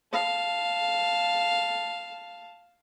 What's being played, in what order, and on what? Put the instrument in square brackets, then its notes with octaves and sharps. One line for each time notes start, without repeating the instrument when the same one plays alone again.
[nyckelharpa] F5 A5